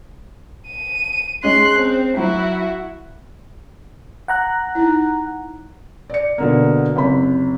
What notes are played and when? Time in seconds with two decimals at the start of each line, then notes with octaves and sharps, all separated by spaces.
0.68 D#7
1.43 G#3 C#4 C6 F#6
1.78 C4
2.17 F#3 E4 F#4
4.28 F#5 A#5 F#6
4.75 D#4 E4
6.10 D5 C#7
6.38 B2 D3 A#3
6.96 F#1 C3 B5